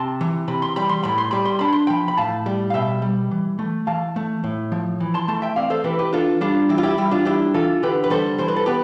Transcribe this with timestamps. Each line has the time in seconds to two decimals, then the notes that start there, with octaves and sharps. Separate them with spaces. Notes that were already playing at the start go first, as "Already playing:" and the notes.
Already playing: C3 A5 C6
0.21 E3
0.48 C3 B5
0.62 C6
0.76 G3 B5
0.89 C6
1.03 A2 B5
1.18 C6
1.31 G3 B5
1.45 C6
1.59 D4 B5
1.73 C6
1.87 F3 G5 B5
2.08 B5
2.17 A2 F5 A5
2.46 G3
2.70 F5
2.74 B2 E5 G5
3.02 G3
3.31 E3
3.59 A3
3.87 E3 F5 A5
4.16 A3
4.44 A2
4.72 F3
5.00 E3
5.14 A5 C6
5.28 A3 A5 C6
5.42 E5 G5
5.56 C4 D5 F5
5.70 A4 C5
5.84 E3 G4 B4
5.99 G4 B4
6.13 D4 F4 A4
6.41 G3 D4 F4
6.69 E3 E4 G4
6.78 F4
6.83 E4 G4
6.98 G3 E4
7.11 D4 F4
7.25 D4 E4 G4
7.54 E3 F4 A4
7.83 D3 G4 B4
8.04 B4
8.10 G3 A4 C5
8.38 E3 C5
8.48 B4
8.56 A4
8.66 B3 G4 B4